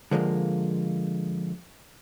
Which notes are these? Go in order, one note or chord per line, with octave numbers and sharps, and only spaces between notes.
D3 F3 G#3 A#3